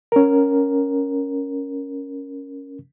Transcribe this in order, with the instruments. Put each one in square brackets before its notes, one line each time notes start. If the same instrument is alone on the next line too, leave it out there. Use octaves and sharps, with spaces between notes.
[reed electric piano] C#4 A#4